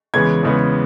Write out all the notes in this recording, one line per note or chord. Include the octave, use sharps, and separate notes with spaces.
E2 C#3 G#3 B3 G#6
E2 C#3 G#3 B3